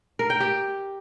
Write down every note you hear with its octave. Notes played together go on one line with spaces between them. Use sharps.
A#4
G5
G4